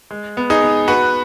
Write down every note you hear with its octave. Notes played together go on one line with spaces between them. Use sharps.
G#3
B3
D#4 G#4
B3
B3 F#4 B4